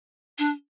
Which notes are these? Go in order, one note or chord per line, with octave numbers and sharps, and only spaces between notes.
D4